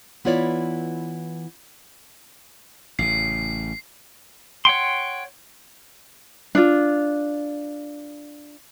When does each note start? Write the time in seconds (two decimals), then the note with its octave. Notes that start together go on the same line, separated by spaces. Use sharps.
0.25 E3 B3 E4 F4 C#5 D5
2.99 A1 C#3 C7
4.65 C#5 F#5 G5 C6
6.55 D4 F4